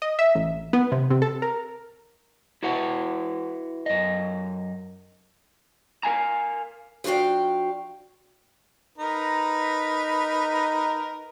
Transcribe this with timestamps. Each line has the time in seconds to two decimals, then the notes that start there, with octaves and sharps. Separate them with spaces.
0.02 D#5
0.19 E5
0.35 A1
0.73 B3
0.92 C3
1.10 C3
1.22 A4
1.42 A#4
2.63 E4 F#4 B4 F#5
3.86 F#2 D#5
6.03 A#4 F5 G#5 A#5
7.04 F3 D4 F#4 F5 G5
8.98 D#4 A#4 B4